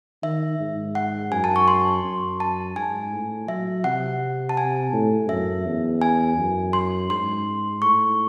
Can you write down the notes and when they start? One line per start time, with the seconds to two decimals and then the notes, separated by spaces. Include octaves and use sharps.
0.23 D#3 E5
0.60 G#2
0.95 F#5
1.32 F#2 G#5
1.44 A5
1.56 C#6
1.68 C6
2.04 F#2
2.40 A5
2.76 G#2 G#5
3.12 A2
3.48 F#3 E5
3.84 C3 F#5
4.49 A5
4.57 G#5
4.93 A2
5.29 F#2 E5
5.65 E2
6.02 G#5
6.37 F#2
6.73 C6
7.10 G#2 C6
7.82 A2 C#6